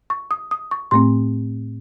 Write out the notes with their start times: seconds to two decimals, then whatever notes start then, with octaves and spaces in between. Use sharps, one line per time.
0.10 C#6
0.31 D#6
0.51 D#6
0.71 C#6
0.91 A2 A3 C4 C6